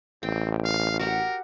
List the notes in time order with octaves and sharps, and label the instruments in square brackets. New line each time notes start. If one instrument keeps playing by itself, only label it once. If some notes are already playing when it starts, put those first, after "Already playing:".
[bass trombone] A1 [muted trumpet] C4 [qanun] G5
[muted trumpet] F5
[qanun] F#4 G4 F#5 [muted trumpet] A#4